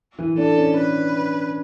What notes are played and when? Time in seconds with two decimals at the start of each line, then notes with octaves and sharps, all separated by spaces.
0.19 E3
0.37 D4 A4
0.58 C#4
0.76 B4